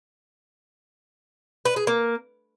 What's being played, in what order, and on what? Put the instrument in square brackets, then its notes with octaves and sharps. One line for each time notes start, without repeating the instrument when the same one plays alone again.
[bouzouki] B4
G#4
A#3